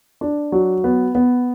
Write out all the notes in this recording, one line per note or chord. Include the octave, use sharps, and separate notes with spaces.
D4
F#3
B3
B3